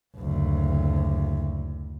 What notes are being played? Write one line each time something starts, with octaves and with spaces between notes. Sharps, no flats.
F#1 D2